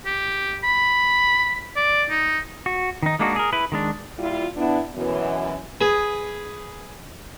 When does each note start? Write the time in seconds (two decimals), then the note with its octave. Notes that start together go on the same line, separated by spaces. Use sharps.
0.06 G4
0.63 B5
1.76 D5
2.10 D#4
2.66 F#4
3.02 D#3 D#4
3.19 G#3 A#3 D4 D#4 F#4
3.36 G#4 A#4
3.53 E4 B4
3.72 D#3 G#3 D4
4.19 A#2 G3 E4 F4
4.57 B3 D4 E4
4.95 F#2 B2 E3
5.81 G#4 B4